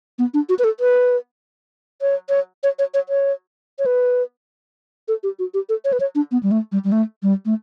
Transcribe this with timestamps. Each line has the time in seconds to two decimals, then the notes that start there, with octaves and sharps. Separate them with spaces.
0.19 B3
0.34 D4
0.49 F#4
0.59 B4
0.64 A4
0.80 B4
2.02 C#5
2.29 C#5
2.63 C#5
2.79 C#5
2.94 C#5
3.09 C#5
3.79 C#5
3.86 B4
5.08 A4
5.23 G4
5.39 F#4
5.54 G4
5.69 A4
5.85 C#5
5.93 B4
6.00 C#5
6.15 D4
6.31 B3
6.43 G3
6.51 A3
6.72 G3
6.84 G3
6.92 A3
7.23 G3
7.46 A3